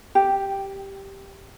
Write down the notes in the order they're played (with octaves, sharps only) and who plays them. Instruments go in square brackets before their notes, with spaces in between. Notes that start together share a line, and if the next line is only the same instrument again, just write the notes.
[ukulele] G4